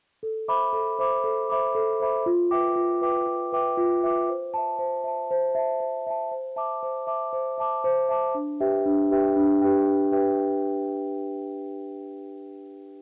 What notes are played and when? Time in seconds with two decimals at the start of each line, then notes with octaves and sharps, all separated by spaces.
0.23 A4
0.48 C5 E5 B5 D6
0.73 A4
0.99 C5 E5 B5 D6
1.24 A4
1.49 C5 E5 B5 D6
1.75 A4
2.00 C5 E5 B5 D6
2.26 F4
2.51 B4 E5 G5 D6
2.76 F4
3.02 B4 E5 G5 D6
3.27 F4
3.52 B4 E5 G5 D6
3.77 F4
4.03 B4 E5 G5 D6
4.29 C5
4.54 E5 A5
4.79 C5
5.04 E5 A5
5.31 C5
5.55 E5 A5
5.80 C5
6.07 E5 A5
6.32 C5
6.56 E5 A5 D6
6.83 C5
7.07 E5 A5 D6
7.33 C5
7.58 E5 A5 D6
7.84 C5
8.09 E5 A5 D6
8.35 D4
8.60 G4 B4 E5 G5
8.85 D4
9.11 G4 B4 E5 G5
9.36 D4
9.62 G4 B4 E5 G5
9.86 D4
10.12 G4 B4 E5 G5